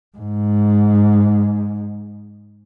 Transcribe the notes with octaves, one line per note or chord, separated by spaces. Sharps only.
G#2